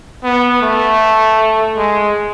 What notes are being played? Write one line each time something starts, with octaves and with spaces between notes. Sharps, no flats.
B3
A3
G#3